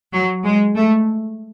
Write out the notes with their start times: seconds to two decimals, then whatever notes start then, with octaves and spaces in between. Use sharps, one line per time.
0.13 F#3
0.45 G#3
0.76 A3